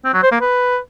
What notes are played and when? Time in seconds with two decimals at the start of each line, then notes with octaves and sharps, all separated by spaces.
0.05 C4
0.14 F#3
0.23 C5
0.32 A#3
0.41 B4